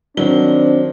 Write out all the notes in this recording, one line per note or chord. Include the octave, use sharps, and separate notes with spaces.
D#3 F#3 C4 D4 G7